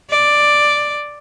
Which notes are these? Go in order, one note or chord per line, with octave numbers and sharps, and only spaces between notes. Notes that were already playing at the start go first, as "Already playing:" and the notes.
D5